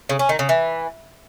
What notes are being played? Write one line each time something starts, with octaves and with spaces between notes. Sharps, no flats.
C#3
C#4
D#3
C#3
E3